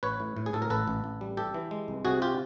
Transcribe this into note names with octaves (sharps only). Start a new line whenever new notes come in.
A1 B4 C#5
A2
A2
G#4
A2 A4
A#4
A1 A4 B4
A1
A1
G3
E3 G4 A4
E3
G#3
C2
C3 F#4 G#4
F4 G4